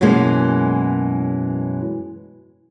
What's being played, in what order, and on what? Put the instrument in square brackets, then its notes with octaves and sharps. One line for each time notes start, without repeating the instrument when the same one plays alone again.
[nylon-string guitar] F#2 B2 E3 G#3 A#3